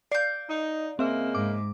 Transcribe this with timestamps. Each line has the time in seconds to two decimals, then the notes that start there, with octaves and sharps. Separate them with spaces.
0.12 D5 F5 G6
0.49 D#4
0.99 C#3 G#3 A#3 C4 E5
1.35 G#2 D6